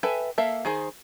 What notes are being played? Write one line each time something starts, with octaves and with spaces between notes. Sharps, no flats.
A4 B4 E5 G5 G#5
A#3 A4 E5 F5
D#3 G#4 C5